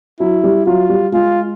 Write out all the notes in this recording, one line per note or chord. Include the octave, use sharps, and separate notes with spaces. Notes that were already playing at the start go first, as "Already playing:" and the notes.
F#3 E4
G3
F#3 F4
G3
G#3 F4